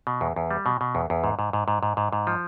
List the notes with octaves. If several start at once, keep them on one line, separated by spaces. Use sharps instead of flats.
B2
E2
E2
G3
B2
B2
E2
E2
G#2
G#2
G#2
G#2
G#2
G#2
G#2
F3